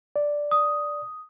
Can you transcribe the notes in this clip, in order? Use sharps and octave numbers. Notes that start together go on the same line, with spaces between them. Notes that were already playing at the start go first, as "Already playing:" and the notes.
D5
D#6